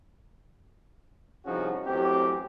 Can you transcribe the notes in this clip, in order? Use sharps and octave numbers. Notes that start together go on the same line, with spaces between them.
C2 F3 C#4 D#4 F#4 G#4
A1 F#2 C4 G4